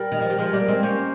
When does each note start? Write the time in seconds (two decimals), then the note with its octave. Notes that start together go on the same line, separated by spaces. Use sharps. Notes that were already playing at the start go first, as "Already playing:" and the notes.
Already playing: G3 A#4
0.12 D#3
0.21 F3
0.30 G3
0.38 F3 G#3 A#4
0.53 G3 A#3
0.61 A#4
0.68 G#3 C4
0.83 A#3 C#4 C5